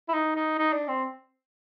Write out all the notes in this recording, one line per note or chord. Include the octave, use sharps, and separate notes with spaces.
E4
D#4
D#4
D#4
D4
C4